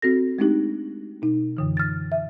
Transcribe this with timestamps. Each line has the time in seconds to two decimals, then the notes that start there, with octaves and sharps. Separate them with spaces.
0.02 C4 F#4 A4 A#6
0.39 G#3 A3 C4 D4 D#4 G4
1.22 B2 D#4
1.57 F#2 D3 E3
1.77 F6 A6
2.12 E5